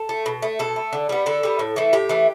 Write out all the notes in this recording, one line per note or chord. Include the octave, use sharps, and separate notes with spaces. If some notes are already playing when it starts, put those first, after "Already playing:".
Already playing: A4
A3
B2
A3
B2 A4
A3
D3
G3 B3
D3 A4
G3 B3
A2
E3 A3
A2 G4
E3 A3